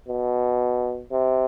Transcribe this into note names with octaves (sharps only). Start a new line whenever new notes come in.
B2
C3